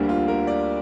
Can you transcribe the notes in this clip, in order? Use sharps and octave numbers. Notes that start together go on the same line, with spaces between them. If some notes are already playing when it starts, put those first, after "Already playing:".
Already playing: D2 D3 G3 A#3
F4
A#4
D5